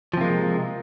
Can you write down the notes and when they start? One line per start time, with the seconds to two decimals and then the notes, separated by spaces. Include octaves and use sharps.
0.14 F3
0.17 C3
0.21 A#3
0.25 G#3